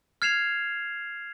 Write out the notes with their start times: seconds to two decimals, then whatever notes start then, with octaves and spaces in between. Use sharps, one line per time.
0.22 F6 G#6 C7 E7 F7